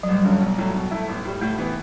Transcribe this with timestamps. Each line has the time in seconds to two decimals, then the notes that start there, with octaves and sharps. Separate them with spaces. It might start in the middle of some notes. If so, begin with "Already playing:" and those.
0.03 F#3
0.08 A1 G3
0.25 G2 D3 F#3 C#4
0.41 B1
0.58 A2 F#3
0.75 B2
0.91 A3 E4
1.08 A1
1.25 A2 G3
1.41 A2 A3
1.58 E3 B3